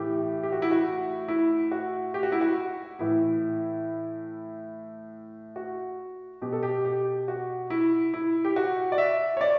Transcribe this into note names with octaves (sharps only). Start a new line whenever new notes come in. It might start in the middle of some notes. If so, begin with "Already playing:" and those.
Already playing: A2 E3 G4
G4
F#4
E4
F#4
E4
F#4
G4
F#4
E4
F#4
A2 E3 E4
F#4
B2 G4
A4
G4
G4
F#4
E4
E4
G4
F#4
D5
E5
C#5
D5